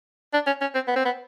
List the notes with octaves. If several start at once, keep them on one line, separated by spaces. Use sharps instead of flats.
D4
C#4
C#4
C4
B3
C4
B3